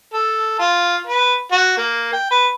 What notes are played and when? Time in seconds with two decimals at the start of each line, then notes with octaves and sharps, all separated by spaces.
0.13 A4
0.59 F4
1.07 B4
1.52 F#4
1.77 A#3
2.13 G5
2.31 B4